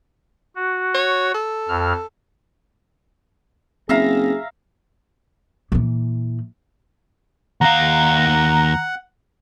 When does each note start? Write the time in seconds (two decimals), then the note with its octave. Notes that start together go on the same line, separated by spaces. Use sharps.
0.56 F#4
0.94 C#5
1.34 A4
1.69 F2 F6
3.89 F#1 C4 G#4 E5 F5 A#5
5.72 A#2 E3
7.61 D#2 F5 F#5 A#5